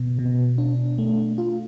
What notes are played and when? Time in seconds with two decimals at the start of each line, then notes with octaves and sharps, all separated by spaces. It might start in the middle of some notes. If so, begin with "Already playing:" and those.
Already playing: B2
0.19 B2
0.58 D4
0.98 A3
1.38 F4